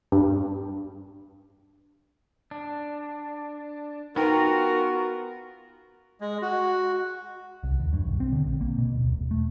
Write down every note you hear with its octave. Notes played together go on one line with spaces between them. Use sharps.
G2
D4
B3 D#4 F4 F#4 A#4 B4 G5
G#3
F#4
C2
D#2
G2
B1
C4
D3
A#1
A#3
B2
D1
E1
A3